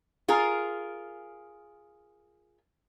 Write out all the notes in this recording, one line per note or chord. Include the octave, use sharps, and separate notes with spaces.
F4 G#4 A#4